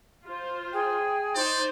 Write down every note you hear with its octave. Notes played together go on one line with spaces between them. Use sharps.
F4 C5
G#4 G5
D#4 C5 D5